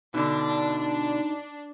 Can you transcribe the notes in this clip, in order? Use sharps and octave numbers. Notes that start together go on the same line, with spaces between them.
B2 D3 D4 D#4